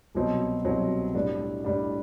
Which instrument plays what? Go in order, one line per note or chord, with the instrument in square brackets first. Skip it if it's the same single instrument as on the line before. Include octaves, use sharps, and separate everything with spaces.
[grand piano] C2 B2 F#3 C4
C2 B2 F#3 C4
A2 G3 D4
A2 G3 D4